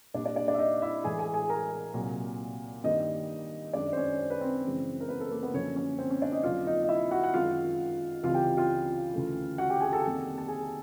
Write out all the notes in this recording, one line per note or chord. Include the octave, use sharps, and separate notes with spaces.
A#2 G3 A#3 D4 D5
D4 D5
D4 D5
D4 D5
E5
D#4 D#5
E4 E5
A2 E3 G#3 G#4 G#5
G#4 G#5
G#4 G#5
A#4 A#5
C2 A#2 F#3
G2 D#3 G3 A#3 D#4 D#5
F#2 D#3 G#3 D4 D5
C5
C#4 C#5
C5
B4
C4 C5
F#2 C#3 E3 G#3
A#4
B3 B4
A4
A#3 A#4
B3 B4
F#2 D3 F3 A#3 C#4 C#5
C#4 C#5
C4 C5
C#4 C#5
D4 D5
D#4 D#5
F2 D3 F#3 A#3 F4 F5
D#4 D#5
D#5
E4 E5
F#4 F#5
F#5
F#2 D#3 G#3 F4 F5
C#2 C3 E3 G3 F4 F5
G4 G5
F4 F5
D2 C#3 E3 A3
F#4 F#5
G4 G5
G#4 G#5
A4 A5
F2 C3 D#3 G3 A#3
A5
G#4 G#5